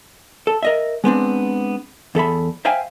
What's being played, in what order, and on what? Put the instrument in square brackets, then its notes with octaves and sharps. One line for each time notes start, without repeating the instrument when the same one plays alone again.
[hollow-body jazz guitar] A4
A#4 D#5 E5
G#3 B3 C4 D4
E2 A4 E5 B5
C5 E5 F5 G5 G#5